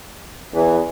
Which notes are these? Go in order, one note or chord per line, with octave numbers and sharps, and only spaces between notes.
E2 E3